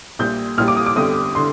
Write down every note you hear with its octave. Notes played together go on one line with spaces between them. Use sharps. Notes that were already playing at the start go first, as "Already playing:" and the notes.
A#1 A#2 G3 G6
A#1 A#2 G3 F6
D6
D#6
D6
G1 F2 D3 G3 D#6
D3 C6